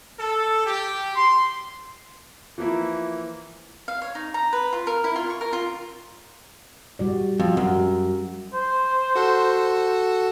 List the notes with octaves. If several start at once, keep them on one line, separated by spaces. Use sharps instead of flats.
A4
G4
C6
E3 F3 A#3 E4
F5
C#5
D#4
A#5
B4
F4
A#4
E4
F4
C#6
A#4
F4
G3 F#4 D5
F2 F#4
F#2 F#3
C5
F#4 A4 F#5